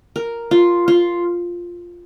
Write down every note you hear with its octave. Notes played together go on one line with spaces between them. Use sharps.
A#4
F4
F4